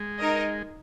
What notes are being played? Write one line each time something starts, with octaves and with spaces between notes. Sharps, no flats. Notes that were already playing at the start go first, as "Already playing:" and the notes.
Already playing: G#3
D#4 A#4 D#5